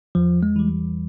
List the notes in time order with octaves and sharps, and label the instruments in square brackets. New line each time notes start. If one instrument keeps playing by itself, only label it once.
[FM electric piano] E2 [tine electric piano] F3
[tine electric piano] G#3
[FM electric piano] E3 G3